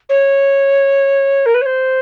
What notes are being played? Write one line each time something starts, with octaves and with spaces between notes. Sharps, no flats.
C#5
A#4
B4
C#5
C5